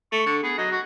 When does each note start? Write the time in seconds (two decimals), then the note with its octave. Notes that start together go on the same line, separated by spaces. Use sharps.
0.12 A3 C#6
0.26 D3
0.43 B3 G#4
0.58 F#3 D#5
0.72 F#4